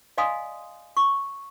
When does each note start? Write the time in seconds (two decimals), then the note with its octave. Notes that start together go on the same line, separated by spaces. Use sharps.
0.18 D5 D#5 F5 G#5 C6 D#6
0.97 C#6